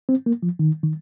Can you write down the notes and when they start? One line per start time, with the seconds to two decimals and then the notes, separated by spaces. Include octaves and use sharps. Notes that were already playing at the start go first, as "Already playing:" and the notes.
0.09 C4
0.26 A#3
0.43 F3
0.59 D#3
0.83 D#3